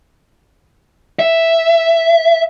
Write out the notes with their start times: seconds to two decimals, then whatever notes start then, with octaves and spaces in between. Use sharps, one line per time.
1.19 E5